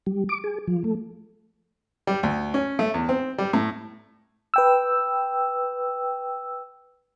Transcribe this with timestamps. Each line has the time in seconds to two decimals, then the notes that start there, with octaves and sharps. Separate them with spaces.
0.07 G3
0.29 D6
0.44 G#4
0.67 F3
0.84 A3
2.07 G3
2.23 D2
2.54 C#4
2.79 A3
2.94 E2
3.09 C4
3.38 G3
3.53 A2
4.54 B4 G5 E6